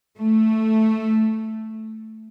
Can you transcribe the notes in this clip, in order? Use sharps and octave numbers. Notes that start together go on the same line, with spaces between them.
A3